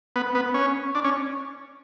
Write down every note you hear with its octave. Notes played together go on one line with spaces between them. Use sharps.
B3
B3
C#4
D4
C#4